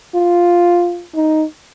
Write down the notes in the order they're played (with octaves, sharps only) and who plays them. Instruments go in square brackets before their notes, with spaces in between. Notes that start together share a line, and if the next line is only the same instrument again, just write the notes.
[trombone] F4
D#4